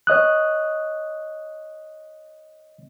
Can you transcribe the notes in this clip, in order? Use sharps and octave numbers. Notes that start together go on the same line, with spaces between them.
C#5 D#5 D#6 F#6